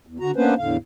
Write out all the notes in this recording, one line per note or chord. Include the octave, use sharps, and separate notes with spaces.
E2
D3 F#4 A#5
A#3 B3 C#4 D4 B4 C5
E2 A2 D3 F5